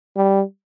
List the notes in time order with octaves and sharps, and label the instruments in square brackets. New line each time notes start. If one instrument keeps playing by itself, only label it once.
[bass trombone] G3